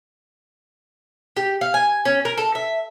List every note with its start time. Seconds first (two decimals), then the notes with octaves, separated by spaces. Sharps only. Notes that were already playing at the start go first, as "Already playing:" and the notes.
1.37 G4
1.61 F5
1.74 G#5
2.05 C#4
2.25 A#4
2.38 A4
2.55 E5